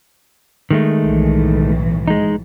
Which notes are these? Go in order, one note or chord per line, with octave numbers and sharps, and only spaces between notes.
D#3 G#3 A3
B1 A2 E3
G#3 D#4